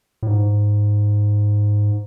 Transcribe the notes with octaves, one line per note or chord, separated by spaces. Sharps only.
A2
G#2